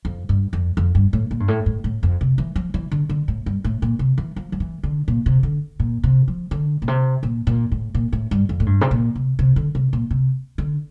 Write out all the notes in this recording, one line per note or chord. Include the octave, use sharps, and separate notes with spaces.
F2
G2
F2
F2
G2
A2
A#2
G2
A2
A2
A2
F2
C3
E3
F3
E3
D3
D3
A2
G2
A2
A#2
C3
E3
F3
F3
E3
D3
A#2
C3
D3
A#2
C3
F3
D3
A#2
C3
A#2
A#2
A2
A#2
A2
G2
F2
A2
G2
C3
A#2
C3
C3
D3
C3
A#2
C3
D3